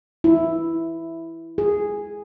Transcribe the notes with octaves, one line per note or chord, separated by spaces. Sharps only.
E4
G#4